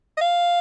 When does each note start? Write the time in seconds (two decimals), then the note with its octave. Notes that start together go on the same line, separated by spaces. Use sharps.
0.18 D#5
0.21 F5